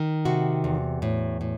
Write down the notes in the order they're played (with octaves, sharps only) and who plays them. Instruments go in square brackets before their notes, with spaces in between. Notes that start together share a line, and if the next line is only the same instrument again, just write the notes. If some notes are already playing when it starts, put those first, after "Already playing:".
Already playing: [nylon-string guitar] D#3
C3 F#4
E2
A2
A2